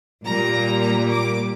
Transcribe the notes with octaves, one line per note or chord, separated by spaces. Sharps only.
A#2 G3 A#3 A#5
A#5
D6